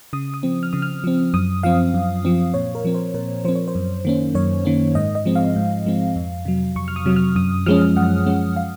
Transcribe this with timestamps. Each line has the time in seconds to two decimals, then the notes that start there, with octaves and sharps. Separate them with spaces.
0.13 C#3 D#6
0.34 D#6
0.43 F3 C4
0.63 F6
0.73 C#3 D#6
0.82 F6
1.04 F3 C4
1.34 F#2 D#6
1.63 F3 C4 F5
1.94 F#2
2.25 F3 C4
2.54 A#2 C#5
2.75 A#4
2.84 F3 C4
2.94 C5
3.14 A#2 A#4
3.45 F3 C4 C5
3.55 C#5
3.68 C5
3.75 F#2
4.05 D#3 A#3 C#4
4.35 F#2 C#5
4.65 D#3 A#3 C#4
4.95 G#2 D#5
5.15 D#5
5.26 F3 G#3 C4
5.35 F5
5.56 G#2
5.86 F3 G#3 C4
6.16 F2
6.45 C3 F#3
6.76 F2 C#6
6.88 F6
6.96 D#6
7.06 C3 F#3
7.16 F6
7.36 F#2 D#6
7.66 F3 G#3 C#4 F6
7.96 F#2 F#5
8.26 F3 G#3 C#4
8.56 F5